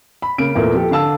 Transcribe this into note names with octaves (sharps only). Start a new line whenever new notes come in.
B5
C#3 A#3 D7
E2 A#2 A3 A#3
F3 G4 A4
D3 F5 A5 E6